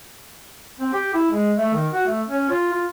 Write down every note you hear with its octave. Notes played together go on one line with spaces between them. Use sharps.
C4
G4
E4
G#3
A3
D#3
F#4
A3
C#4
F4
F4